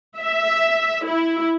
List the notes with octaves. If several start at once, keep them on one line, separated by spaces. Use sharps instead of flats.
E5
E4